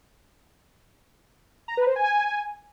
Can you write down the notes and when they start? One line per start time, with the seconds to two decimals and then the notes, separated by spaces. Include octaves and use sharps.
1.68 A#5
1.77 B4
1.87 C5
1.96 G#5